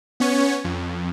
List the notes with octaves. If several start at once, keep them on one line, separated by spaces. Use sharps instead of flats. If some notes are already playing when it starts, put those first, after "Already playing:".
B3 C#4 C#5
F2